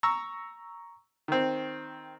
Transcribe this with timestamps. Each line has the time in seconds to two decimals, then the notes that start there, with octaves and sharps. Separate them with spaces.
0.03 A#5 C#6 E6
1.28 D#3 C4